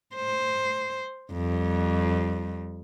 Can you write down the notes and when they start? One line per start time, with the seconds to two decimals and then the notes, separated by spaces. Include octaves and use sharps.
0.16 C5
1.33 F2 G3